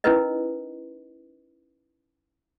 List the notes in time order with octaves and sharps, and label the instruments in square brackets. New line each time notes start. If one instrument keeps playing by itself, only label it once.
[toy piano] C#4 D#4 E4 A#4 B4 D#5